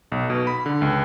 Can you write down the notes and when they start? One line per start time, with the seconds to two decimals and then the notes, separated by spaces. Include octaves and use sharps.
0.12 B1
0.30 B2
0.47 B5
0.66 D3
0.82 C#2